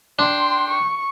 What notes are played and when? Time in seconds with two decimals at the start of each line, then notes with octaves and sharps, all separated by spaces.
0.19 D4 G5 C6
0.70 C#6